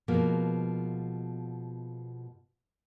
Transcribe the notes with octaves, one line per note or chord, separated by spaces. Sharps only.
B2 F3 G#3 A#3